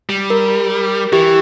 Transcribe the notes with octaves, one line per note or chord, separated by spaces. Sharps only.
G3
A#4
E3 G4